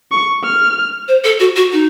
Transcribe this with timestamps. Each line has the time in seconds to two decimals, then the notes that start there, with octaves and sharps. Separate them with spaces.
0.12 C#6
0.44 F6
1.08 C5
1.24 A4
1.40 F#4
1.56 F#4
1.72 D#4